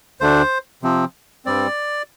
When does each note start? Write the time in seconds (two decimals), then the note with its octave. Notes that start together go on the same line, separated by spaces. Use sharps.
0.21 D2 D3 A3 D4 C5
0.83 C3 F3 C4
1.45 G2 G3 C4 D5